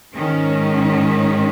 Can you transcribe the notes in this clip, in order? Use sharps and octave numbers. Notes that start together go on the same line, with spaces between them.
G#2 D#3 C#4